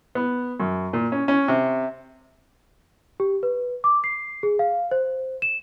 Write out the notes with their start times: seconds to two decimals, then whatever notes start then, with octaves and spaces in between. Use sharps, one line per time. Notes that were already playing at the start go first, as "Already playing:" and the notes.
0.15 B3
0.60 F#2
0.93 A#2
1.12 C#4
1.28 C#4
1.48 C3
3.20 G4
3.43 B4
3.84 D6
4.04 C7
4.43 G#4
4.59 F5
4.91 C5
5.42 E7